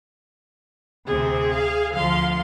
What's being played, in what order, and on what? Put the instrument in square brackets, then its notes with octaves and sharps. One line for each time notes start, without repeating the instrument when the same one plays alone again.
[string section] D2 C3 C4 [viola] G#4
[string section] F5
[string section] D2 F3 C6 [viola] F5